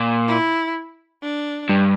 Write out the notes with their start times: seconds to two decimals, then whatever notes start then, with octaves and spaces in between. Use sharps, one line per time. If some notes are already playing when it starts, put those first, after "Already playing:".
Already playing: A#2
0.27 E4
1.22 D4
1.69 G2